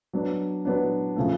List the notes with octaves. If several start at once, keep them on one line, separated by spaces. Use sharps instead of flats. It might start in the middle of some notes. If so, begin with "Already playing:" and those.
F#3 B3 D4
F#3 B3 D4
C#3 F3 A3